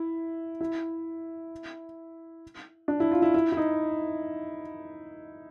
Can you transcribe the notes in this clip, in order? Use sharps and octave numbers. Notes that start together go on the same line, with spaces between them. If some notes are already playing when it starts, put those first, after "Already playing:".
Already playing: E4
E4
D4
E4
F4
E4
E4
E4
D#4